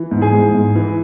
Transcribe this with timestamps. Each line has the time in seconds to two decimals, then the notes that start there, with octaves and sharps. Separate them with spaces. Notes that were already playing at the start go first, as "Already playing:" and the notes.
Already playing: E3
0.11 G#2
0.22 G#4 G#5
0.32 G#2
0.55 G#2
0.76 E3